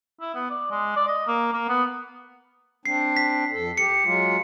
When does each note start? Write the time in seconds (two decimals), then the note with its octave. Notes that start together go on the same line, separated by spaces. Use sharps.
0.21 E4
0.35 B3
0.50 D5
0.71 G#3
0.96 D5
1.08 D#5
1.28 A#3
1.52 A#3
1.68 B3
2.86 C4 D4 C7
3.17 B6
3.52 F2 A4
3.78 G4 C#7
4.04 F#3 G#3 F4